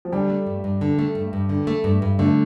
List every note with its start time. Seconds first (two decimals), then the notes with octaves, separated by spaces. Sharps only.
0.05 F3
0.12 D3 G3
0.30 A3
0.46 G2
0.64 G2
0.81 D3
0.99 A3
1.15 G2
1.33 G2
1.49 D3
1.67 A3
1.84 G2
2.02 G2
2.19 D3 A3